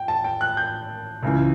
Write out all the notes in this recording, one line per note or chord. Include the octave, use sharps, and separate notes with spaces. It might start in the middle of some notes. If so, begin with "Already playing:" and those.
Already playing: G5
A5
G5
F#6
G6
C#2 C#3 E3